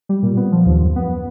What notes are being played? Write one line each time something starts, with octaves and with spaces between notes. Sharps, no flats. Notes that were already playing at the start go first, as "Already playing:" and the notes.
G3
A#2
B3
F3
D#2
F#2
B3